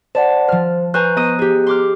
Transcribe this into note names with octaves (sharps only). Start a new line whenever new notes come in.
C5 D5 F#5 A5
F3 C5 F6
B4 C5 G#5 A#5 C#6 F#6
B3 D#5 A#5 D#6 F#6 D#7
G4 G#4
C6 D6 F6